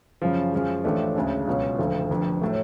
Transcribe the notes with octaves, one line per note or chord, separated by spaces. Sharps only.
F#2 C#3 F3
F#2 F3 G#3
A1 A2 F3 A3 D4
D2 C#3 G#3 D4
C#2 B2 F#3 C#4 F4
F#1 F2 D3 F3 A3
F1 F2 D3
A2 F#3 A3